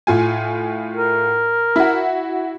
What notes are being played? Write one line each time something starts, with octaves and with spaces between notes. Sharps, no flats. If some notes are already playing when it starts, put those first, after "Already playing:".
A2 F4 G#5
A#4
E4 F#4